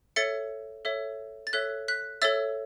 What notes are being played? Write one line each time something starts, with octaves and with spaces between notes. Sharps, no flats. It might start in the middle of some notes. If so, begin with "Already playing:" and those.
A4 C#5 E5 A6 C#7
A4 C#5 E5
A6
A4 C#5 E5 F#6 B6
F#6 B6
A4 C#5 E5 E6 A6